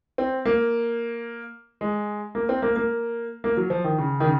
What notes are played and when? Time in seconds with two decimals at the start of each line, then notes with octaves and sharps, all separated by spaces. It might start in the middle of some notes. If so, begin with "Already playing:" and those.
0.18 C4
0.45 A#3
1.81 G#3
2.35 A#3
2.49 C4
2.62 A#3
2.76 A#3
3.44 A#3
3.57 F#3
3.70 F3
3.84 D#3
3.98 C#3
4.20 D#3
4.24 C#3